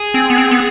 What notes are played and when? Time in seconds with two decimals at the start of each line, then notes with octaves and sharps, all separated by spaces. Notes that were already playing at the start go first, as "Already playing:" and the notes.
Already playing: G#4
0.14 C4
0.30 B3
0.38 C4
0.51 B3